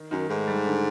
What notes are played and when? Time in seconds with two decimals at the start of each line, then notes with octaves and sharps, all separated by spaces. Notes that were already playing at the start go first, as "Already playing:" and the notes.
Already playing: D#3
0.11 F#2 D#3
0.29 G#2 A3
0.47 G3
0.66 D3